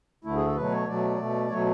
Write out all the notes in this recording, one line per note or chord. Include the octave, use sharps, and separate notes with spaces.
D2 D3 A3 E4
G#4
A4
B2 F#3 A3 B4
C#5
B2 F#3 A3 D5
B2 A3
B2 F#3 A3 C#5